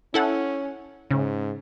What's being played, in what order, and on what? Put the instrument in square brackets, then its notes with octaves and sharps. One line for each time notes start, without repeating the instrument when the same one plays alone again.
[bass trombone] C#4 [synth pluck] E4 A4 F#5
[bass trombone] G#2 [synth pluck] C#3